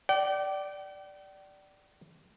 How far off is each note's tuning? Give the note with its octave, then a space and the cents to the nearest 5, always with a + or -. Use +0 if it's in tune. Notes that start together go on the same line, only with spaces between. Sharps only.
D5 +0 G5 -40